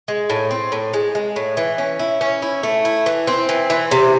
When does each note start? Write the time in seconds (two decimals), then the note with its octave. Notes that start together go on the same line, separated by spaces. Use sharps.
0.08 G#3
0.30 A2
0.51 C4
0.72 A2
0.94 G#3
1.15 G#3
1.36 A2
1.57 E3
1.78 C#4
2.00 E4
2.21 C#4
2.42 E4
2.63 A3
2.85 E4
3.06 E3
3.27 C4
3.49 E3
3.70 E3
3.91 C3